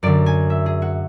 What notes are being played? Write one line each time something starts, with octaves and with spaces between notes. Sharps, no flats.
F#2 D3 D5
G#5
E5
G#4
F#4